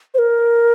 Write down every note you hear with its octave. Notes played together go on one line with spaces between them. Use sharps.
C5
A#4